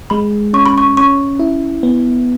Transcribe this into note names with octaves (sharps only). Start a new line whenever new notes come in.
G#3 B5
C#4 C#6
B5
C#6
C#4 C#6
E4
B3